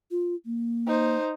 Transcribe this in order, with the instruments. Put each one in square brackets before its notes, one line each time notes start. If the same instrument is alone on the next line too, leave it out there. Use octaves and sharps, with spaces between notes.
[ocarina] F4
A#3
[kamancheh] D#4 C5